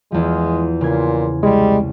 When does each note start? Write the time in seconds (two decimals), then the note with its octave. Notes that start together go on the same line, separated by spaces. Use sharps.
0.12 E2 F3 G#3
0.81 A#2 C#3 C6 G#6
1.43 C2 G3 G#3